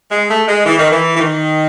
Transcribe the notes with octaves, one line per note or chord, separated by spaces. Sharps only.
G#3
A3
G#3
E3
D#3
E3
E3
D#3